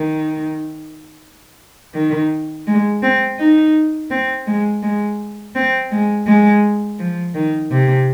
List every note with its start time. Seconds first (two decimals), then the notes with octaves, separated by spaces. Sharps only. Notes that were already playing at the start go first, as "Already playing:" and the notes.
Already playing: D#3
1.94 D#3
2.67 G#3
3.03 C4
3.39 D#4
4.11 C4
4.47 G#3
4.83 G#3
5.55 C4
5.91 G#3
6.27 G#3
6.99 F3
7.35 D#3
7.71 C3